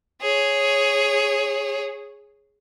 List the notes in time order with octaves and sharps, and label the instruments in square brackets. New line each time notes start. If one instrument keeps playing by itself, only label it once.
[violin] G#4 C#5